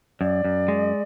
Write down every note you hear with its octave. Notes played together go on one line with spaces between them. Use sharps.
F#2 D5
F#2
G#3